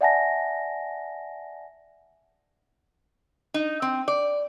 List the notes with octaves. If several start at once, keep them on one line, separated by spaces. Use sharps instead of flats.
D5 E5 F#5 G#5 A5 A#6
D#4
C4
D5